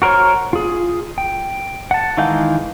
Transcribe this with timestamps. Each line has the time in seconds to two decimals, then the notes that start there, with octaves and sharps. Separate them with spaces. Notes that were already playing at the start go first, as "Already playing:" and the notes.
0.02 F#4 A#4 C5 C#5 F6
0.53 F4 G#4
1.18 G5
1.91 F#5 A5
2.17 D#3 E3 G#3 F5 G6